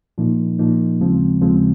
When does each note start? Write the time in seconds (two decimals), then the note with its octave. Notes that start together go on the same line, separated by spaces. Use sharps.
0.18 A#2 F3 A#3 D#4
0.59 A#2 F3 A#3 D#4
0.99 D#2 C#3 F3 G#3 C4
1.41 D#2 C#3 F3 G#3 C4